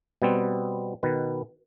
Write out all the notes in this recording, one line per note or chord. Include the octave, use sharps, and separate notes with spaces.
B2 G3 B3 C4
B2 D#3 B4